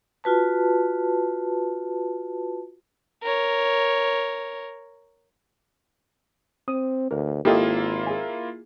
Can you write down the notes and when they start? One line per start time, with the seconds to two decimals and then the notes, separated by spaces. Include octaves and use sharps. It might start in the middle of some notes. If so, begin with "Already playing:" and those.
0.24 F4 F#4 B4 A5
3.23 A#4 C#5
6.68 C4 D#6
7.11 D2 A#4
7.45 G#1 A#3 E4 F4 G4 A4 D#5
8.07 G#4 G#5